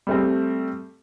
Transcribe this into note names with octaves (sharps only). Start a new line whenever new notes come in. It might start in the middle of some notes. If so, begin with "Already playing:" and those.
G3 A3 C4